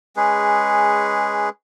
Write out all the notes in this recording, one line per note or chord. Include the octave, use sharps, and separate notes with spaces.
G#3 C#4 G#4 B4